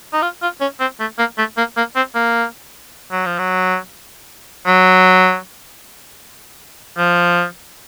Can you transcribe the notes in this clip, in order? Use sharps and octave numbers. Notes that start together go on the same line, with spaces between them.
D#4
F4
F4
C#4
C4
A3
A#3
A3
A#3
A#3
C4
A#3
F#3
F3
F#3
F#3
F3